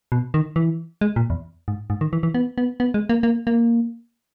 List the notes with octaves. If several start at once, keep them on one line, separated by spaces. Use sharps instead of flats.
B2
D#3
E3
G#3
A#2
E2
G#2
G#2
D#3
E3
E3
B3
B3
B3
G#3
A#3
A#3
A#3